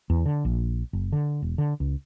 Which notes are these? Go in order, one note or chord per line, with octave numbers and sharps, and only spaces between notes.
E2
D3
A#1
F#1
D3
E1
D3
C#2